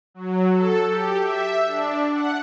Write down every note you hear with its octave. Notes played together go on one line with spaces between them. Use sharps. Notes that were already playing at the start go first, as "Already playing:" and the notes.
F#3
A4
G4
E5
D4
F#5